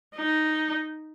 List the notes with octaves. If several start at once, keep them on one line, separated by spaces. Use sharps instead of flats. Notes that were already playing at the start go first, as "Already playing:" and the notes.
D#4